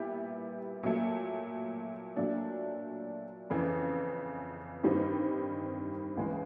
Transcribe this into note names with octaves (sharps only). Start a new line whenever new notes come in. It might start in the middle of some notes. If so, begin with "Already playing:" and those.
Already playing: A#2 G3 B3 E4 G4
A#2 F#3 A3
A#2 F#3 A3 D4
F2 C#3 E3
G2 D#3 G3 C4 D#4
C#2 C#3 E3 G#3